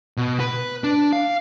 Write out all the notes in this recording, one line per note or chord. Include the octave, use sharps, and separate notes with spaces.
B2
B4
D4
F5